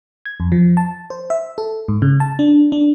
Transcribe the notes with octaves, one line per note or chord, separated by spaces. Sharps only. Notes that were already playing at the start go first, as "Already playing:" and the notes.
G#6
F2
F3
A5
C5
E5
A4
G#2
C#3
A5
D4
D4